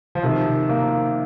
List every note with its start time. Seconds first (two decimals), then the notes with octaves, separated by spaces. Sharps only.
0.15 F3
0.23 C3 D#3
0.69 A#3